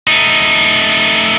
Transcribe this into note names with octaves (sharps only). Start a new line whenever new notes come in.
A3 D#4